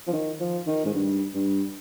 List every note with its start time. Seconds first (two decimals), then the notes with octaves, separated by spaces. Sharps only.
0.07 F3
0.13 D#3
0.40 F3
0.67 D#3
0.86 G#2
0.94 G2
1.34 G2